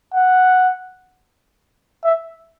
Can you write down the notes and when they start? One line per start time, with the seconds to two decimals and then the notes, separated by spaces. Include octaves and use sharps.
0.14 F#5
2.04 E5